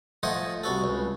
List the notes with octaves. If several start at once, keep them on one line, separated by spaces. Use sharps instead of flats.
F3 A3 C5 D#5 F#5 G#5
C2 F#4 A4
C#2